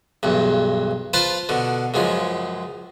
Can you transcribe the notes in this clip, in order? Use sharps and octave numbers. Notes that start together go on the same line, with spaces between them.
B1 E2 G2
F4 B4 C5 A5
B2 D3
C#2 F#2 F3 G#3